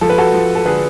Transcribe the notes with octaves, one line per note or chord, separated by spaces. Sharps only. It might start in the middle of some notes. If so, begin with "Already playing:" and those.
F3 A4
B4
F#4 A4
F3
A4
D3 G#4 B4